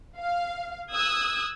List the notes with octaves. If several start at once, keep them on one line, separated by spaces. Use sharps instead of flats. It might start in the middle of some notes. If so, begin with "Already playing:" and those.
F5
D#6 E6 F#6 G#6